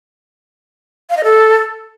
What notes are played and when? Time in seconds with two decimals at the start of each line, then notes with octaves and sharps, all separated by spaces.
1.10 F5
1.17 D#5
1.24 A4